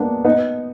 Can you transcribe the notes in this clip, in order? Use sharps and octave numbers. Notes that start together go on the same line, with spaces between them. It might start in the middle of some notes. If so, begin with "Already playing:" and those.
Already playing: G#3 A#3 B3 D4
B3 D#4